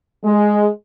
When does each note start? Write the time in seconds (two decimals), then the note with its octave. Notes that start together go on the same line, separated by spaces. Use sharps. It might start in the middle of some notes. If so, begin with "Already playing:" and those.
0.24 G#3